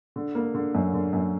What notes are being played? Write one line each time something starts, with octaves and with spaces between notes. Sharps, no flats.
D3
A#3
D3
F#2
D3
F#2